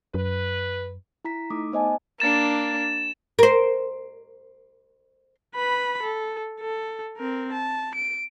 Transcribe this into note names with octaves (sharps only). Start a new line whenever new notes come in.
F#2 B4
E4 A#5 B6
A3 D#4 D6 D#6
B3 C5 D#5 G#5 A5
A#3 D4 A6 E7
A#4 C5
B4 B5
A4
A4
C4 A#4
A5
D7